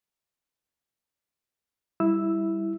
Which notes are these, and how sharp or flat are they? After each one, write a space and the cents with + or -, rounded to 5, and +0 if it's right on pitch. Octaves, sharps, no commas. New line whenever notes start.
G3 +0 E4 -5 E6 +0